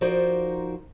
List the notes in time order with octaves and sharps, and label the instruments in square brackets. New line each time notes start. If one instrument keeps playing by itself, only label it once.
[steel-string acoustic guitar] F3 D#4 F#4 A#4 C5 D5